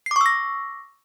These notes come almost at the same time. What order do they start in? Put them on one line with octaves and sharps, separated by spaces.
C7 D6 C#6 E6 A#6